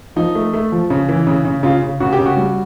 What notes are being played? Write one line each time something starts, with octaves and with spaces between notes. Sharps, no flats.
F3 D#4
A3
A3
F3
C#3
E3
C#3
C#3
C#3 F4
C#3
C#3 F#4
G4
C#3
F#4
G3